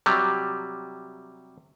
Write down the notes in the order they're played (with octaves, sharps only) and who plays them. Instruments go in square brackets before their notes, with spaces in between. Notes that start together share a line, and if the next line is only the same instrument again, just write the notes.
[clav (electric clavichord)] C3 F#3 G3